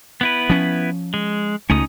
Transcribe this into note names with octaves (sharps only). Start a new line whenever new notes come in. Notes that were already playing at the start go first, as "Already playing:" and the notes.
B3 E4 B4
F3 C#4
G#3
C#2 A3 C#4 D#4 D#6